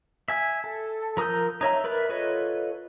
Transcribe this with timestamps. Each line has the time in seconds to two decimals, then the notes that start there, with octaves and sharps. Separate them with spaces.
0.28 E5 G#5
0.64 A4
1.17 F3 A#4 D#6 E6 G6
1.61 D#4 C#5 E5 A#5
1.84 A#4 B4 D5 E5
2.09 F4 A4 B4 C#5 D#5